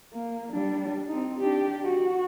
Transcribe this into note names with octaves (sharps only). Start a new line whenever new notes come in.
A#3
G3 D4
C4 D#4
D4 G4
F#4